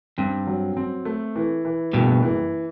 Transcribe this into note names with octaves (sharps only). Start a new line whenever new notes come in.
G2 C4
F#3
C4
A3
E3
E3
F#1 G2 B2
E3